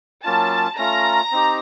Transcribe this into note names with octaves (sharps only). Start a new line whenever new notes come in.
F#3 A#3 C#4 F4 A5
A3 C#4 F4 A#5
C4 D#4 G4